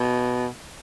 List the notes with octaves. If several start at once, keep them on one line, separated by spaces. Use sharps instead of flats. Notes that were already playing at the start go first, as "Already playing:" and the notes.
Already playing: B2